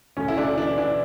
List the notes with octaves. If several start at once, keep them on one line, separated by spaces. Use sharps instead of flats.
D2 C#4
E4
D2 D4
E3 D4
E3 D4